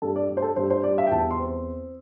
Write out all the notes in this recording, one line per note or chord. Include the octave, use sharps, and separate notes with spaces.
G2 A4
D5
G2
C5
A4
G2 C5
C5
G3 D5
E5
G5
E2 A5
C6
C4